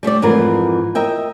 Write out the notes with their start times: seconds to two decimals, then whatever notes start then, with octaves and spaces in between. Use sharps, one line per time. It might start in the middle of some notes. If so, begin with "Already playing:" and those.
0.03 G3 A3 G4 D5
0.22 F2 G#2 E3 F4 A#4
0.95 A#4 D#5 E5 G5